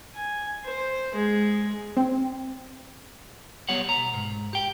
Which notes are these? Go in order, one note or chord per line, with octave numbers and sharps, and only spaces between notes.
G#5
C5
G#3
C4
B1 G3 B3 C#5 F#5
B2 A#5
G#2
G4 G5